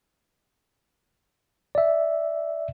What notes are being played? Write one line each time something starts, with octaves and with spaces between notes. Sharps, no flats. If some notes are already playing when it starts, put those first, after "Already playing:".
D5 E5